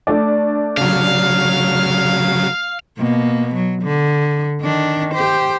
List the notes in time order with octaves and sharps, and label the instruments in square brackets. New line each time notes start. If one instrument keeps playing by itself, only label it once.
[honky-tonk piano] A3 D4 D5
[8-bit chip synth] C#3 F#3 [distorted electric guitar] F5
[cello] B2 A#3
F#3
D3
D#3 D4
G4 C5